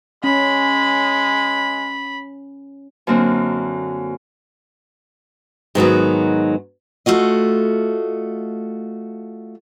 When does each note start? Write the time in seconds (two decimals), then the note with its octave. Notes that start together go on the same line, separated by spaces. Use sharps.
0.24 G#3 C#4 B5
3.07 F#2 D3 A#3 C4
5.75 G#2 D#3 F#3 B3
7.06 A3 F4 F#4 D#5